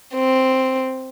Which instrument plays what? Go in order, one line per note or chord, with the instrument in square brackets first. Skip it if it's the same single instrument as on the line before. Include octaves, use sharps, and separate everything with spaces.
[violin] C4